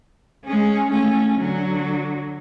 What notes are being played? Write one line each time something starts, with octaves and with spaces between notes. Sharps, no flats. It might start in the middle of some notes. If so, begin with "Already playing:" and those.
G#3 C#4
A3 C#4
D3 F#3